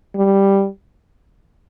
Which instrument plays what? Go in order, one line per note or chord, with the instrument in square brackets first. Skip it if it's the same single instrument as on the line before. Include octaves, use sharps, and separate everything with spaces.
[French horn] G3